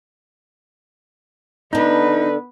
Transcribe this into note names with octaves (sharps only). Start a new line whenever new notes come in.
D3 B3 D4 D#4 B4